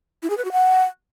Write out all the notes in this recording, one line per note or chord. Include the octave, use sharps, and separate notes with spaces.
E4
G#4
B4
F#4
F#5